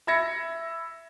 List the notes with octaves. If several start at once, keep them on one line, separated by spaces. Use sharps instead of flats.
E5 B5 E6 G#6 A#6 C#7